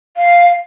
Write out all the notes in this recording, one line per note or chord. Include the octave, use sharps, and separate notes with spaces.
F5